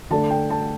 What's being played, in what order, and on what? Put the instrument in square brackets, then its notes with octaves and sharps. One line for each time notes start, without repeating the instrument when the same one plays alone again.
[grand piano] D3 A3 D4 A5
G5
A5